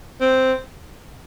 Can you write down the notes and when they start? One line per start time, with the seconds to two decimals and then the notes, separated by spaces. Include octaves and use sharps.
0.21 C4